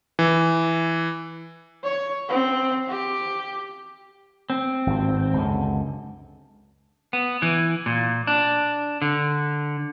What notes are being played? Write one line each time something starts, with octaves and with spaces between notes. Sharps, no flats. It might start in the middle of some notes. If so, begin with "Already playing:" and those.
E3
C#5
C4
G4
C4
G#1 G2
C#2 F#2 D3
B3
E3
A#2
D4
D3